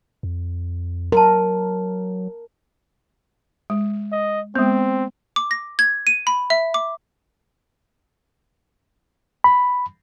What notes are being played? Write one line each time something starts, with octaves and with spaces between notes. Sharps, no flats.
F2
F#3 A#4 A5 A#5 C6
G#3
D#5
G#3 B3 C4
D6
A#6
G#6
D#7
B5
E5
D6
B5